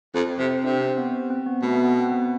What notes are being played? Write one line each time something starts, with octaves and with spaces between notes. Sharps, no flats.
F2 C4
C3 C4
C3 D4
C4
B3
C4
B3
B2 A3
B3
B3
C4
B3